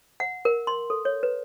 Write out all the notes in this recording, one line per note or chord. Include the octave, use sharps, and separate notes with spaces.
F#5
A#4
C6
A4
C#5
B4